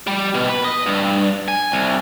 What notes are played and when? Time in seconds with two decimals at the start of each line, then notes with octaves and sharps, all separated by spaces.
0.07 G3
0.34 B2
0.49 B4
0.64 D#5
0.86 G2
1.48 G#5
1.72 C2